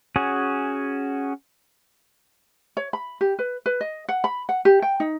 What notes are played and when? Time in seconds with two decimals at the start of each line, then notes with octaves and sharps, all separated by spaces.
0.16 C#4 F#4 G#4
2.77 C#5
2.93 B5
3.21 G4
3.39 B4
3.66 B4
3.81 D#5
4.09 F#5
4.24 B5
4.49 F#5
4.65 G4
4.82 G5
5.00 D#4